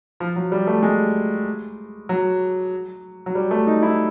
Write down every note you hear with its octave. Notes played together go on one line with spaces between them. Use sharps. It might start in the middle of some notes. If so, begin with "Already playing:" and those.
F3
F#3
G3
A3
G#3
F#3
F#3
G3
A3
D#4
E4